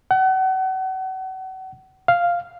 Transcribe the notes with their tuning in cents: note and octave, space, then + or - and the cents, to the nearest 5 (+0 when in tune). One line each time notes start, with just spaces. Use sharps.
F#5 +35
F5 +0